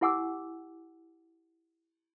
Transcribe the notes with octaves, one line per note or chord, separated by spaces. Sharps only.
E4 G4 F#5 G#5 D6 E6